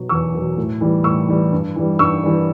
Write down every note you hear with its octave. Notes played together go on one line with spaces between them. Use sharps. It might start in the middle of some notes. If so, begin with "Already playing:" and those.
Already playing: B2 F#3
E2 C#6 E6
B2 F#3
A2
E3 G3
A2 C#6 E6
E3 G3
G2
E3 G3
G2 C#6 E6
E3 G3